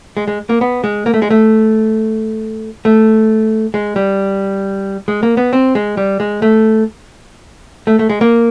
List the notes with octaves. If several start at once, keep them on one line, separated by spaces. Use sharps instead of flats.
G#3
G#3
A#3
B3
G#3
A#3
A3
G#3
A3
A3
G#3
G3
G#3
A#3
B3
C4
G#3
G3
G#3
A3
A3
A3
G#3
A#3